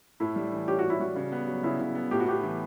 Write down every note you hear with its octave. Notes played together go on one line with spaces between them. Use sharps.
A2 E4
G3
E3
C#4 G4
F#4
A2
E4
G3 F#4
C#3
B3
F#3
C#3 E4
C#3
B3
A2 G4
F#4
B3 G4
E3